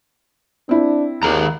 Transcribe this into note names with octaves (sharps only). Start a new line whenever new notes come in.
C4 D4 E4
D#2 D#3 G#4 A#5